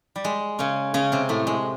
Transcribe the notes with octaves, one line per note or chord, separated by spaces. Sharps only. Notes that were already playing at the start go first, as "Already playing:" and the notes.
G3
G#3
C#3 C#4
C#3 C#4
C3 C4
A2 A3
G#3